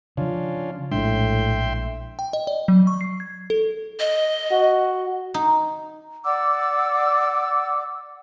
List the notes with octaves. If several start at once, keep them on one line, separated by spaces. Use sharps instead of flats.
C#3 F3 C#4 D4 F4
A#1 A2 G#3 D4 E5 G5 C6
G5
D#5
D5
F#3
C#6
C7
G#6
A4
D#5
F#4
D#4
D5 F#5 D6 E6